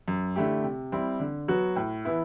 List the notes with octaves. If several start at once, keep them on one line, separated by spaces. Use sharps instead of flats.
F#2
D3 A3 E4 G4
C3
G3 C4 E4
D3
F#3 B3 F#4
A2
E3 B3 E4